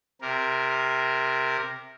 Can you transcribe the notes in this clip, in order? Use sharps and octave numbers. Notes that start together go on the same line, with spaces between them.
C3 A#4